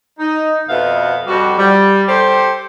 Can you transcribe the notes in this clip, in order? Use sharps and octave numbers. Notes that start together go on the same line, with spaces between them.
D#4
F2 B2 B3 E5 F5
F2 G3 F#4
G3
G4 A4 C5